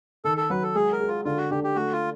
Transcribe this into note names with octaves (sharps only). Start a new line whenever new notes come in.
D#3 A4
A4
F#3 B4
A4
G#3 G#4
A#4
G#4
F4
D3 F4
F#4
D3 G4
G4
A3 F#4
F4